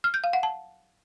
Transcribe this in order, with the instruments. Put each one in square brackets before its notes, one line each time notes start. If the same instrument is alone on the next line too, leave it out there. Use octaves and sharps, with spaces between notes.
[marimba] F6
G6
F5
F#5
A5